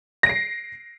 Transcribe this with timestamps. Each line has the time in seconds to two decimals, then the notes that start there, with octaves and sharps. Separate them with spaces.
0.23 A#6
0.26 D7
0.29 C7